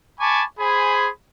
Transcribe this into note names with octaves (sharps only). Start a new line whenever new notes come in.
G#5 A5 B5 C#6 D6
G#4 C5 G#5 B5